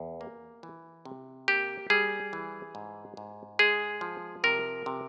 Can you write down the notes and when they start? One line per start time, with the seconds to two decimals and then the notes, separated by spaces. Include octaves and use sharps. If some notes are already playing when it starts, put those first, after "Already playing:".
Already playing: E2
0.21 A#3
0.63 E3
1.05 C3
1.48 A#3 G4
1.90 G3 G#4
2.33 E3
2.75 G#2
3.17 G#2
3.59 G#3 G#4
4.01 F3
4.44 C3 A#4
4.86 C3